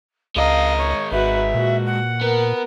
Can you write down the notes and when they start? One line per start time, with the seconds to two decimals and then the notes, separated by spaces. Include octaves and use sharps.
0.36 C#2 G#3 A#4 D#5 F5
0.78 C#5
1.12 G#1 F#4 B4 E5
1.54 A#2 F#4
1.86 F#5
2.21 B3 A#4